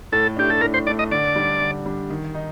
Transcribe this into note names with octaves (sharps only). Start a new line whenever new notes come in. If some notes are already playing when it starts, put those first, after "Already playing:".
A2 A4
A3 D4 G4
A4
A2 A#4
C5
A3 D4 D5
D#5
D3 D5
G3 D4
D3
G3 D4
D#3
D#4